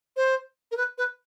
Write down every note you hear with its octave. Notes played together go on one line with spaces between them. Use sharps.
C5
A#4
B4
B4